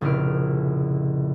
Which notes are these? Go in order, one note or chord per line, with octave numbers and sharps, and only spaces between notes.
F1 A#1 C#3 E4 F6 D7